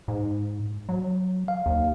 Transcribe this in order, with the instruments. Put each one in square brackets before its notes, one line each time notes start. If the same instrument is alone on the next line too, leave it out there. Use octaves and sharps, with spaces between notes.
[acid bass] G#2
F#3
[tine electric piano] F5
[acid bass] D#2